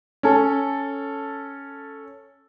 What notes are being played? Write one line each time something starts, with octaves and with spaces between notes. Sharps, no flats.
C#4 A4